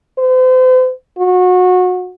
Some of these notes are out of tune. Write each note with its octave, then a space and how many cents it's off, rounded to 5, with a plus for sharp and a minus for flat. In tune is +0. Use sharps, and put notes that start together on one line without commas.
C5 -40
F#4 -25